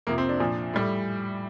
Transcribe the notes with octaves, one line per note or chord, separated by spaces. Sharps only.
F2 C3 F3 A#3
C4
D4
A#2 F3
A2 G3